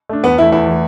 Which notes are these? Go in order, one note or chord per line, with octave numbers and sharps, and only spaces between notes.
A3 D4
E2 B3
E3 A3 E4
E2 E4
E3 A3